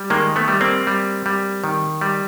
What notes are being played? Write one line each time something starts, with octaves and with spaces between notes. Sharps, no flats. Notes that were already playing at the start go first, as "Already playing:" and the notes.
Already playing: G3
D#3 G#3 A#3
A3 B3
G3
A#3 C4
G3
G3
D#3
G3